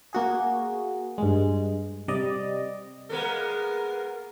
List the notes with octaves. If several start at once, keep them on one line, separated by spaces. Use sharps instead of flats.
A#3 F#4 G#4
G2 G#3
C3 G3 D5 D#5
G#3 A#3 B3 A#4